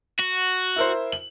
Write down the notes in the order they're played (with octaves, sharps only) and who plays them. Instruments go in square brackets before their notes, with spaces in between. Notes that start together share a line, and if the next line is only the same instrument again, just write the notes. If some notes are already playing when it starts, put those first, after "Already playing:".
[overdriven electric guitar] F#4
[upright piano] E4 A#4 C5
F#7